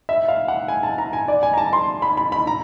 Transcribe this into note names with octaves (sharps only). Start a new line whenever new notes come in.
E5
F5
F#5
G#5
A5
A#5
G#5
D5
G#5
A#5
A5
C6
B5
B5
B5
A#5